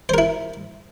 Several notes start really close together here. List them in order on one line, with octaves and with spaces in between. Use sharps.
C5 A#4 E4